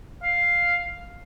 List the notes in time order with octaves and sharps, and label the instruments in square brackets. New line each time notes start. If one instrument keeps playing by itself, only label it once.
[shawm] F5